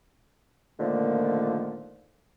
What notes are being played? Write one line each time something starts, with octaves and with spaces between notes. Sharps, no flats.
A#2 D3 D#3 F3 A3 A#3